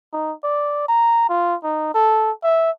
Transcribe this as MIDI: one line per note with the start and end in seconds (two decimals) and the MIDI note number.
0.13 0.33 63
0.44 0.84 74
0.88 1.29 82
1.29 1.55 65
1.64 1.90 63
1.94 2.32 69
2.43 2.71 76